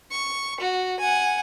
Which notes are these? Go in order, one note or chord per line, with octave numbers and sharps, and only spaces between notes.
C#6
F#4
F#5 G#5